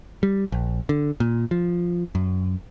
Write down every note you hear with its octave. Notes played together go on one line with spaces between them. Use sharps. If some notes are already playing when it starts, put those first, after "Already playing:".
G3
A#1
D3
A#2
F3
F#2